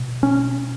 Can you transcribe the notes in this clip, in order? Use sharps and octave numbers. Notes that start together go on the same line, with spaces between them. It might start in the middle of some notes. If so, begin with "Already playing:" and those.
Already playing: B2
C#4